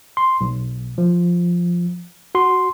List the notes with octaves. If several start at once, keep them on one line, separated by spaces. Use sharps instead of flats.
C6
B1
F3
F#4 C6